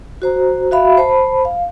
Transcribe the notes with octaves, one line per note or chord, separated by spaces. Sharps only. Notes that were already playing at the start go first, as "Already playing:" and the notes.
F#4 C5 A#5
F#4 E5 F5 B5
C5 A5 B5
F5